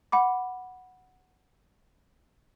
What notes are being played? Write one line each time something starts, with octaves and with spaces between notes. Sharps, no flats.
F#5 B5 D6